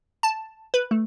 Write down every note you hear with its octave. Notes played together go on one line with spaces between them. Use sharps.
A5
B4
A3